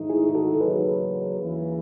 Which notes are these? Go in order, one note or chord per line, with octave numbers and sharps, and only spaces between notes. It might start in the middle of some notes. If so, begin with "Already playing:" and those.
Already playing: G#2 D#3 A3 D#4
E4 G#4
F#4 A4
F#1 E2 C#3 F#3 G#4 B4
D#2 C#3 E3